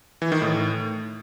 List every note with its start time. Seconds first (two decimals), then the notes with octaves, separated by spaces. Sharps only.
0.22 E3
0.32 D#3
0.42 A2